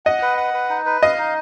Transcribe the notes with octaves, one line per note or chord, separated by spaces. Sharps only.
D#5 F#5
B4
F#5
B4
D#4
B4
D#5 F5
D#4